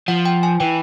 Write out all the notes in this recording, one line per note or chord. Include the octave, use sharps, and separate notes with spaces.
F3 F#5
G5
G#5
E3 G5